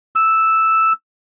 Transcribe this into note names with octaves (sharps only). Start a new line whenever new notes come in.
E6